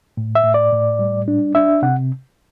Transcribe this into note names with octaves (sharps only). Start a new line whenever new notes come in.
A2
E5
A2
D5
A2
G3
D4
D4 E5
C3 F#5